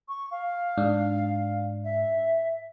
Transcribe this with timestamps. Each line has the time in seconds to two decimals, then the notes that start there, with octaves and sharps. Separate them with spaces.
0.08 C#6
0.31 F5
0.77 G#2 D4
1.84 E5